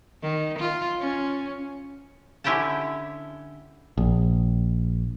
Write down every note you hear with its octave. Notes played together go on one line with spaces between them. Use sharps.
D#3
F4
C#4
D3 C#4 E4 G4 G5 A5
A#1